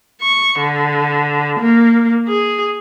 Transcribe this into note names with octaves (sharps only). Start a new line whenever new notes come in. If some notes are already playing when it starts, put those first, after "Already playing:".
C#6
D3
A#3
G#4